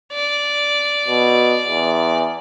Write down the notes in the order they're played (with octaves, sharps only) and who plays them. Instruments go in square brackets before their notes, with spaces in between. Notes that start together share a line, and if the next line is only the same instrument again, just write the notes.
[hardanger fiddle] D5
[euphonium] B2
E2